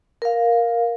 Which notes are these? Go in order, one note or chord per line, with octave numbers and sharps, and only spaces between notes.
A#4 F5